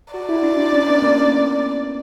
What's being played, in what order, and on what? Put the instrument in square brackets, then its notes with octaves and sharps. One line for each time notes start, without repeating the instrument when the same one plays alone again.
[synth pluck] F#4 [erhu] D5
[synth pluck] E4
D4
D4
C#4
C#4
B3
A#3